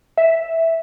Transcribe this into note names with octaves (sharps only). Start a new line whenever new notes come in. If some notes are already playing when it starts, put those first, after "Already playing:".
E5